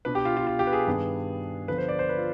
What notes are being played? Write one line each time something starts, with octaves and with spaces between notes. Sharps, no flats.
B2 B3 D4 B4
G4
F4
F4
F4
G4
B4
G#4
G2 D#3 B3 D4
D3 F3 B3 D4 B4
C5
D5
C5
B4
F4